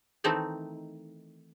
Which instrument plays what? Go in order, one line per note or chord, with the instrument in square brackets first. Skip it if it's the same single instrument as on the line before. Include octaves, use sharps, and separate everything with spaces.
[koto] D#3 E3 A3 C4 D#4